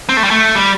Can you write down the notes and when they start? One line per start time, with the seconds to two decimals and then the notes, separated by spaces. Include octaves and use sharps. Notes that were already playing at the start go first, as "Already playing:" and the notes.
0.09 C4
0.17 A3
0.24 G3
0.31 A3
0.55 G3